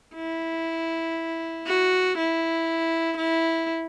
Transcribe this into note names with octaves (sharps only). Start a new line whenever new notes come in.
E4
F#4
E4
E4